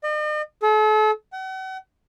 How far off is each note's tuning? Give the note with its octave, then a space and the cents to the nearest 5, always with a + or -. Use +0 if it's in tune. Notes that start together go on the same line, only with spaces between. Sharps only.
D#5 -45
A4 -40
F#5 +40